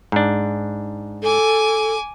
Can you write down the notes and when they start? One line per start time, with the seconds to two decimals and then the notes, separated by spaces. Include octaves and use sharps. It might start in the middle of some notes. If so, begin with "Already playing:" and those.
0.12 G#2 D4
1.22 A4 G#5 D6